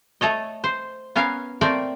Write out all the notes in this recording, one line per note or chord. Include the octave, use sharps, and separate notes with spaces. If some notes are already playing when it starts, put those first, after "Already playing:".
A3 A4 C#5 D#5
C5
B3 C#4 A#4 F5
A3 A#3 C4 A#4 D5 G5